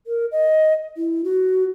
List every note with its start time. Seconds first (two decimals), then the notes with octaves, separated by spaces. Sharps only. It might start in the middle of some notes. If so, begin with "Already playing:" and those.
0.07 A#4
0.32 D#5
0.97 E4
1.24 F#4